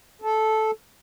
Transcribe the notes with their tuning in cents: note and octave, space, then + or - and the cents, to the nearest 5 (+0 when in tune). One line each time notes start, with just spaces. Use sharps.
A4 -10